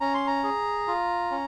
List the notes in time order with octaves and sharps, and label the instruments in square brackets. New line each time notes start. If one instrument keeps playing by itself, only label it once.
[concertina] C#4 A#5
C6
A#5
G#4
F4
C#4